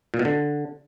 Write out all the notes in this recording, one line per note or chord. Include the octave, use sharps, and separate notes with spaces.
A#2
B2
D3